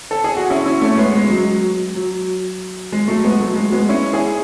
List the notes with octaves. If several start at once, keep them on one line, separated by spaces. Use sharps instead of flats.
A4
G#4
F#4
C#4 E4
C#4 E4
A3 C#4
G#3 B3
G#3
F#3
F#3
G#3
F#3 A3
G#3 B3
F#3 A3
G#3
G#3 B3
C#4 E4
E4 G#4